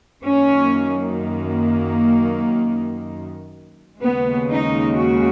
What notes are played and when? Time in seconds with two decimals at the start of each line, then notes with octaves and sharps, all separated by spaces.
0.25 F#2 D#3 A#3 C#4
1.19 A#3
4.01 D#2 C#3 G#3 B3
4.49 D#4
4.95 F#4